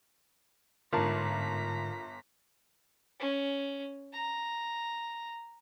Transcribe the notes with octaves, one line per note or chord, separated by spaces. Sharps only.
G1 G#2 D3 F4 A#4 A5 A#5 B6
C#4
A#5